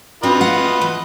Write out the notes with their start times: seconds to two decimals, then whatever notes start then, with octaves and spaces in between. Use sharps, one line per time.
0.23 C4 D4 F4 F#4 B4 D#5
0.41 A3 F5 F#5
0.81 E3